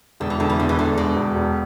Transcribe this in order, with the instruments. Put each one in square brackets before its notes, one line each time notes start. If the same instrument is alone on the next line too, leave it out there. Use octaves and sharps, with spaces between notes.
[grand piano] E1 [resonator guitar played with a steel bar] D3
[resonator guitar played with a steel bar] E3
[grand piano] E1 [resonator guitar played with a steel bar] D3
[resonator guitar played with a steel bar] E3
[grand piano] E2 [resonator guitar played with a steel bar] D3
[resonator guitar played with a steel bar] E3
[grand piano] E1 [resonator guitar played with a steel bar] D3
[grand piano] E1 [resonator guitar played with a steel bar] B2
[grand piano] E1
E1